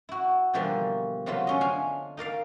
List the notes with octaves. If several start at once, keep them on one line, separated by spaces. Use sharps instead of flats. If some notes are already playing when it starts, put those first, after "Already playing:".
E4 F#4
B2 D3 E3 F3 G3 A#3
C3 F#3 A3 F4 B4
D3 C#4 D#5
D4 F5 G#5
D#4 A#4 D5 F5